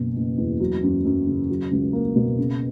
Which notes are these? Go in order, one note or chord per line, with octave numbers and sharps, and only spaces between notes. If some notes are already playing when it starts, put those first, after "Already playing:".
Already playing: F#1 B2
F#1
E2
F#3
F#2
F#2
C#3
F#3
C#2
A#3
B2
C#3